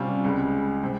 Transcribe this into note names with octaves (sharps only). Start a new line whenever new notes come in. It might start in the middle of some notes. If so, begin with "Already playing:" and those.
Already playing: C3 G3 C#4 F4
C#2 C#3 G#3
C3